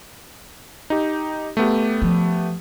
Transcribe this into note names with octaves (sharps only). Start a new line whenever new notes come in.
D#4 G4
A3 B3 G4
F3